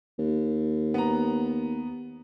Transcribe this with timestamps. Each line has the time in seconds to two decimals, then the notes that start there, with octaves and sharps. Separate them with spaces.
0.19 D#2
0.94 B3 A#5